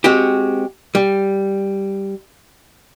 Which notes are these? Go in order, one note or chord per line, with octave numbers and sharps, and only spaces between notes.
G#3 C4 F#4 G4
G3